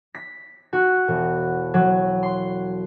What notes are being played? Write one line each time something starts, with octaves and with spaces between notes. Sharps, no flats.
B6
F#4
E1
F#3
C6